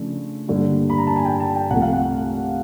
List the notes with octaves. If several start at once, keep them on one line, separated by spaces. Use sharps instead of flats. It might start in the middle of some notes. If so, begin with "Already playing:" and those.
Already playing: C#3 F3 A3 D4
G2 D3 G3 A#3
B5
A#5
A5
G#5
G5
A5
G5
C2 C3 F3 A3 F#5
F5
F#5